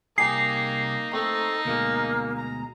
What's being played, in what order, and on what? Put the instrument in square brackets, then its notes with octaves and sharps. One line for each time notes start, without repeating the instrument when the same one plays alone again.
[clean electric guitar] C2 G4 G#4 [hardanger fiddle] A#3 D#4 [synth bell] C7
[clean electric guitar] A3 C4 [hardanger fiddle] D#4 [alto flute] A4
[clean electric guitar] D2 B2 G#3 [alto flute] A#3
[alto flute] A#5